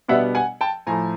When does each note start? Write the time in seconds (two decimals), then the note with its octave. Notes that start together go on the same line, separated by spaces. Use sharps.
0.08 B2 G3 B3 D4 E5 F#5
0.35 F#5 G#5
0.61 G5 A5
0.87 A2 F3 A3 G#5 A#5